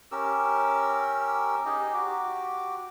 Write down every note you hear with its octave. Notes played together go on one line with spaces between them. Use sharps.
C#4 G4 A#4 E6
D#4 G4 G#4 D#5
F#4 G4 D6